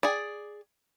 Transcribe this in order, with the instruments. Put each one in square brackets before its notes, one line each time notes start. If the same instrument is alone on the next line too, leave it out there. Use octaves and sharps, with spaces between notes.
[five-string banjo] G#4 D5